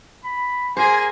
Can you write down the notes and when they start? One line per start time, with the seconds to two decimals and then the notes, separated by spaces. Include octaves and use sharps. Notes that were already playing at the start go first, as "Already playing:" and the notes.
0.24 B5
0.77 A#3 G#4 C5 G#5